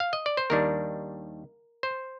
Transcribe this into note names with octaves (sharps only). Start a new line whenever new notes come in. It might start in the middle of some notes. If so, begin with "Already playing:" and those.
F5
D#5
D5
C5
D#2 D#3 G3 D4 A#4
C5